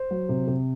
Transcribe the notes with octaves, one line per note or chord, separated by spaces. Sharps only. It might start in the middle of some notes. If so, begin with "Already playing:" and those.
Already playing: C5
F#3
C3
C3